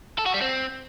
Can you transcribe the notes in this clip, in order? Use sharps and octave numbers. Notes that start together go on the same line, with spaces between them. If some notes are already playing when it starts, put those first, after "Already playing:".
A4
F#4
G3
C4